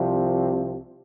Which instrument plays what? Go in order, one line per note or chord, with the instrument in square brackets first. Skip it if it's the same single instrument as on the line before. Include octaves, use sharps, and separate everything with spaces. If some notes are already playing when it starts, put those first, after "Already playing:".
Already playing: [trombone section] C2 C3 F3